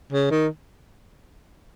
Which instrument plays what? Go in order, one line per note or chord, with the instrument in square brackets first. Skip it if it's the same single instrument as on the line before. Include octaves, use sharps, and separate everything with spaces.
[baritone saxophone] C#3
D#3